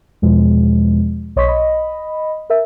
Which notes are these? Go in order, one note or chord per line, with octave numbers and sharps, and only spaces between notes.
E2 B2 F3 G#3
B1 C#5 D#5 C6 C#6 B6
D#5 B5
A#4 E5